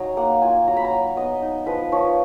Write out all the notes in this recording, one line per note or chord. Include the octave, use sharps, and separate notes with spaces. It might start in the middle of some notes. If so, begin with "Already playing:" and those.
Already playing: F#3 D#4 G#5 A#5
A#3 F#5
F4 G#5
F#3 A#5
B5
A#5
F#3
B3 D#5
D#4
F3 B4
F3 C#5